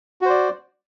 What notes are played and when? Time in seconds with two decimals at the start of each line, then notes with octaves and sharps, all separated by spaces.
0.21 F#4
0.26 C5
0.30 D5